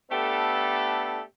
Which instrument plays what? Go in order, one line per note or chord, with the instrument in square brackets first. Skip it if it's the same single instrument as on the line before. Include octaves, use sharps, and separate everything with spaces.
[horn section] A3 B3 D4 G4 A4